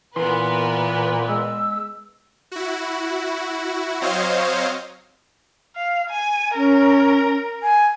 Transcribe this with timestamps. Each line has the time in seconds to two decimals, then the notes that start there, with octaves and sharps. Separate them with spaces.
0.16 A#2 E3 B3 A#4 B4 C6
1.29 G#3 E6
2.51 E4 F#4
4.01 F#3 C4 C5 C#5 D#5 F5
5.76 F5
6.10 G#5
6.56 C#4 A#4
7.63 G#5